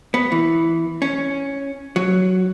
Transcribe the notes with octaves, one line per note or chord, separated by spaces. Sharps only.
B3
E3
C#4
F#3